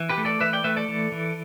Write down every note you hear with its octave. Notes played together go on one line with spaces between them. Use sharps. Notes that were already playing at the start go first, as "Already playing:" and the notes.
Already playing: E3
G4 B4
A3
A4 D5
E3 B4 E5
D5 G5
A3 B4 E5
A4 D5
E3
E3